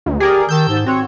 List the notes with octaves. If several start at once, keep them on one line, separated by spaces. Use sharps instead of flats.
D2
G4 G#4 A#4 D5
D#3 A5 E6 G6
G#2
C4 F#4 C#5